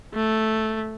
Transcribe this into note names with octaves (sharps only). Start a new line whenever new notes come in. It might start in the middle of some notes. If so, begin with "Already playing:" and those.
A3